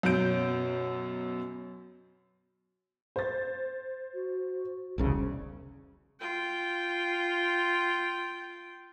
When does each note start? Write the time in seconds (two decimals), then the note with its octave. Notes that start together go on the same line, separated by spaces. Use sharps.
0.03 F#2 B2 F#3 G6 D7
3.16 C5 A6
4.14 F#4
4.98 E1 C2 C#3
6.20 F4 G5